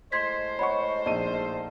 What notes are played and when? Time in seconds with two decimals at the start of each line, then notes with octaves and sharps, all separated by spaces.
0.12 A2 G#3 C5 D#5 C6 G#6 B6
0.59 C#5 F#5 B5 C#6
1.06 A#1 D#4 D5 D#7